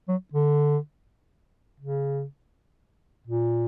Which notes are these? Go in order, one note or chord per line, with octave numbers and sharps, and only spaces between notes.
F#3
D3
C#3
A#2